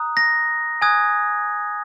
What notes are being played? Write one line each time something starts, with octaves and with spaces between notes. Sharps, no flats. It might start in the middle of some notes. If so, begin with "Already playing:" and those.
Already playing: A#5 D#6 F#6
A#6
G#5 D#6 F#6 G#6